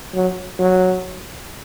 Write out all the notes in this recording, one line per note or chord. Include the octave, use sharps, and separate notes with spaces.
F#3
F#3